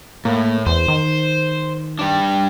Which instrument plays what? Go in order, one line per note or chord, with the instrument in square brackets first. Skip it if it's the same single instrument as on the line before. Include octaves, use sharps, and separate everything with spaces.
[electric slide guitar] A2 [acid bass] A#3
[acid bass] E2 [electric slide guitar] C5
[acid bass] D#3
[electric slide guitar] G3 D4